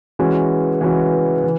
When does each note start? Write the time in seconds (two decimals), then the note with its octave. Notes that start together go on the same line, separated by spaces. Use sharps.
0.19 E3 G#3 C#4 F#4
0.81 E3 G#3 C#4 F#4
1.43 E3